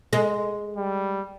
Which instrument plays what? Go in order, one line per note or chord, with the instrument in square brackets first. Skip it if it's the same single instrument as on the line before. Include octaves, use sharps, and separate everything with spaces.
[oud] G#3
[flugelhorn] G3